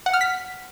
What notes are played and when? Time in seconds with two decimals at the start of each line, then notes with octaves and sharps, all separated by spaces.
0.06 F#5
0.13 F6
0.21 B6